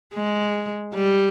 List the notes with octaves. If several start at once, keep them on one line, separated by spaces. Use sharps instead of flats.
G#3
G3